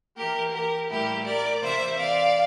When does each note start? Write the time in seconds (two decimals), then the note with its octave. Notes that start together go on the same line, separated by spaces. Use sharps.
0.17 E3 A#3 G4 A#4
0.53 G4 A#4
0.90 A2 G3 A#3 E4 G4
1.26 A#4 D5
1.61 C3 E3 A#3 C5 E5
1.98 D5 F5